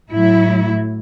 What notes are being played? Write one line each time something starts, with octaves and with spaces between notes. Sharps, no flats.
A2 F#3 E4